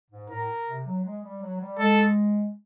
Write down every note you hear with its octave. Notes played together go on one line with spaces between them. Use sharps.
G#2
A2 A#4
C3
F#3
G#3
G3
F#3
G3
G#3 A4